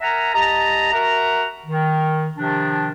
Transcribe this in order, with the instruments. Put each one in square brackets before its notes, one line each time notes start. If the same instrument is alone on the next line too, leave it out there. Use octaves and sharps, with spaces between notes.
[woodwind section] A#4 E5 F#5 G#5 A#5
C2 G4 D#5 A5 A#5
F#4 A#4 E5 F#5 A#5
D#3
C3 D#3 F3 D4